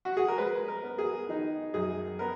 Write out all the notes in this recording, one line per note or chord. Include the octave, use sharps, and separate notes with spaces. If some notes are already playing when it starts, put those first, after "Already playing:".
F#4
G#4
A#4
G#3 B4
A#4
B3
G#4
D#3 D#4
F#2 G#4
B3 A#4